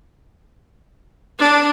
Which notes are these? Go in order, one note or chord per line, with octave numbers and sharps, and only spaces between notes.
D4